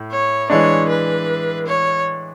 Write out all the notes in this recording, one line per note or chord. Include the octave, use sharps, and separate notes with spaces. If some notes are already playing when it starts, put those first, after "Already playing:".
Already playing: A2
C#5
E3 G#3 D4 C#5
B4
C#5